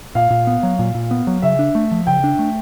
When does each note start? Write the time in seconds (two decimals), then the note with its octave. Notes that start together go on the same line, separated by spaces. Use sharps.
0.15 A#2 F5
0.30 A#2
0.47 B3
0.63 F#3
0.79 A#2
0.95 A#2
1.11 B3
1.27 F#3
1.42 C#3 E5
1.59 D4
1.75 A3
1.91 F3
2.07 C#3 G5
2.24 D4
2.39 A3